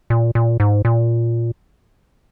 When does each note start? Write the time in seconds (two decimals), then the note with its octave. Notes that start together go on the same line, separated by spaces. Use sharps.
0.10 A#2
0.35 A#2
0.60 G#2
0.85 A#2